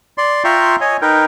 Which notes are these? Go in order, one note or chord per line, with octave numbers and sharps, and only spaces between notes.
D5 C6
F4 E5 G5 A#5 C6 C#6
C#5 D#5 G#5
D#4 A#4 B4 G5